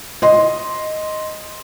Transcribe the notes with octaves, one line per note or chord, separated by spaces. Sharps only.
D#5 C6